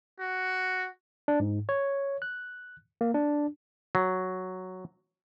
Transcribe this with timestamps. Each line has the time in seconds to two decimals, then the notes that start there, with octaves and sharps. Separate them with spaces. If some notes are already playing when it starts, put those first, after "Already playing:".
0.20 F#4
1.28 D4
1.40 G#2
1.69 C#5
2.22 F#6
3.01 A#3
3.14 D4
3.95 F#3